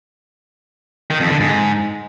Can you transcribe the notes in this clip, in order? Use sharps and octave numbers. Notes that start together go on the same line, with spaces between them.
D#3
F2
D3
G#2